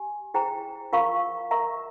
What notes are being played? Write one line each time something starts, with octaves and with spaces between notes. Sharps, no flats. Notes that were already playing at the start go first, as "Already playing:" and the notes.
Already playing: G4 G#5
E4 G#4 C5 G5 A#5
F4 A#4 F5 A#5 C#6
A#4 E5 A#5 C#6